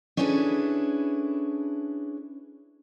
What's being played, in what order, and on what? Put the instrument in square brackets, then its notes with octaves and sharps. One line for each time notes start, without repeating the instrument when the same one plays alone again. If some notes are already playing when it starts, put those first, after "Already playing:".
[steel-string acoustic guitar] C#4 D4 E4 G#4 A4 B4